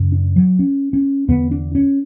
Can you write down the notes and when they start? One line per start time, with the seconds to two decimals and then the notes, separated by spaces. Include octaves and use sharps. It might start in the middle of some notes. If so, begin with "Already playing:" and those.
Already playing: F#2 C#3
0.12 D4
0.36 F#3
0.59 C#4
0.93 C#4
1.28 E2 D3 B3
1.51 D4
1.75 C#4